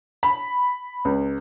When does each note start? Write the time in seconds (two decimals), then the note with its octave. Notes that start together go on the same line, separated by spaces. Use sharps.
0.23 B5
1.05 C#2